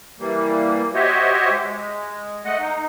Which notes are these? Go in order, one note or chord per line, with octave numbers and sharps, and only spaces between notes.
E3 G3 A#3
F#4 G4 C5 C#5 D#5 E5
G#3
A3 D#5 F#5
D#4